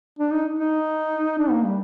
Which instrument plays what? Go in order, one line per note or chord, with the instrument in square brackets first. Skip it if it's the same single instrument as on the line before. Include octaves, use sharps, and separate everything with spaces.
[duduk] D4
D#4
D#4
D4
A#3
G3